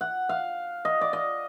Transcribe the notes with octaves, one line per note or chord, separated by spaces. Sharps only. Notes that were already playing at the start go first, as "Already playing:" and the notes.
F#5
F5
D#5
D5
D#5